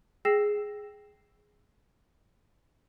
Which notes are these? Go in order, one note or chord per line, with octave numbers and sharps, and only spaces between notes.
G#4 G5 E6 A#6 C7 E7